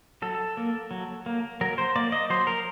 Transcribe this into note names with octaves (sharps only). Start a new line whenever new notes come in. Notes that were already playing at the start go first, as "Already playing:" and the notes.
F#3 A4
A#3
F#3
A#3
F#3 A#4
C5
A#3 D5
D#5
F#3 C5
A#4